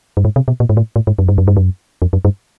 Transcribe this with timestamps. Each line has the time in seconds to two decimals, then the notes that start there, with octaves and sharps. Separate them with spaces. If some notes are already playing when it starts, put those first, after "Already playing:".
0.17 G2
0.25 G#2
0.36 C3
0.48 B2
0.60 A#2
0.69 G#2
0.77 A2
0.96 A2
1.07 G#2
1.19 F#2
1.28 G2
1.38 F#2
1.48 G2
1.57 F#2
2.02 F2
2.13 F#2
2.25 G2